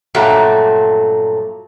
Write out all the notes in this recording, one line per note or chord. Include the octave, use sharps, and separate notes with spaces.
G2 A#2 F#3 A3